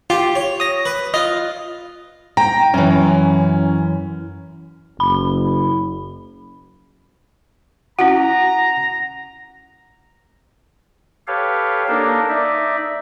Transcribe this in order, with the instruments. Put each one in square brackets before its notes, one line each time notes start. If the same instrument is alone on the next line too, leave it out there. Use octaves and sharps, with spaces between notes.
[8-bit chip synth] F4 [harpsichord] G4
[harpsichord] C#5
[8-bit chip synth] D#6 A#6
[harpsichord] B4
[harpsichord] F4 [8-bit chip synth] D#5
[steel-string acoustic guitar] G5 [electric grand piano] A#5
[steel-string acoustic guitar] F#2 E3 [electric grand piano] C#4
[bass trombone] F#1 [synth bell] B5
[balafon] C#4 E4 F#4 [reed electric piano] F#5 [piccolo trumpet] A#5
[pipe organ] G4 A4 B4 C#5 F5
A#3 D4 D#4 A4 A#4
D#4 D5 E5